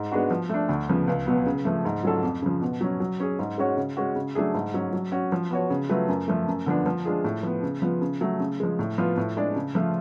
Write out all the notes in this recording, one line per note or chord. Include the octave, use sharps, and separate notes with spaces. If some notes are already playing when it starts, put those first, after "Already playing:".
Already playing: G#2
G#3 B3 D4 F#4
F3
A3 D4
D2
C#3 F3 B3
C#2
B2 F#3 B3
C#3
F3 A3
G#2
F#3 C#4 F4 A4
F2
C#3 F3
B2
F#3 C#4
F#3
C#4 G#4
G#2
G#3 C#4 F#4 C#5
C#3
G#3 C#4 F#4
C#3
F#3 A3 D4 G#4
G#2
F#3 C#4
F#3
C#4 F#4
F3
B3 F#4 C#5
C#3
F#3 A3 F4 B4
F#2
F3 A3
F#2
D3 F3 B3 D4
F3
G#3 D4 F4 G#4
A2
F3 B3
C#3
F3 B3 F4
C#3
F#3 A3
C#3
F3 G#3
A2
F3 B3 F4
A2
G#3 D4 G#4 D5
C#3
F3 A3 F4